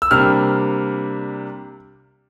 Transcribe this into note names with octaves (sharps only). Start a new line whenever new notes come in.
E6
C3 G3 A#3 D4 F6